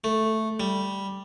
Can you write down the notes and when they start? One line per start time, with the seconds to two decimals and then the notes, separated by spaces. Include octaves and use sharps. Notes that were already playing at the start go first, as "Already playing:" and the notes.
0.04 A3
0.60 G3